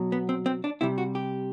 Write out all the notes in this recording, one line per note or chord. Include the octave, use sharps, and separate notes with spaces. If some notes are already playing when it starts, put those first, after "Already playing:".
Already playing: B2 F#3
B3
C4
C4
D4
C3 G3 E4
F#4
G4